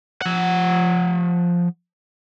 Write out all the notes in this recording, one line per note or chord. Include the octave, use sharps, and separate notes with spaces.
F3 F#5